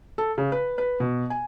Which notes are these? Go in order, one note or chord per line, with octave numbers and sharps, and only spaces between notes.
A4
C#3
B4
B4
B2
G#5